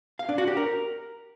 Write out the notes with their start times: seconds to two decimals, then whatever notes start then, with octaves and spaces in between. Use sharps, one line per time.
0.19 F5
0.29 D4
0.38 F#4
0.47 G4
0.57 A#4